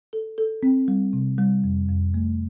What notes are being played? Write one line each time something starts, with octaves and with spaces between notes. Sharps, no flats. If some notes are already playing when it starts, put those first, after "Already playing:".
A4
A4
C4
G3
C3
G3
F2
F2
A3